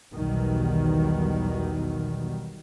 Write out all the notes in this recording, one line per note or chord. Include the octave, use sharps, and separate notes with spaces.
B1 E2 B2 D#3 F#3 G3